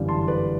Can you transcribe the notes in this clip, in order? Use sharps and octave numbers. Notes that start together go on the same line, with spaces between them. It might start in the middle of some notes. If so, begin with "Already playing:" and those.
Already playing: G1 F#2 E3 G3
A5 C6
B4 D5